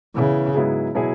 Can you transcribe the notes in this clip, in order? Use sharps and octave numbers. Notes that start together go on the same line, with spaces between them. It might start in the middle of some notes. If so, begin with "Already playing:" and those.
C#3 E3 B3 E4
G#2 F#3 B3 E4 G#4
B2 F#3 E4 G#4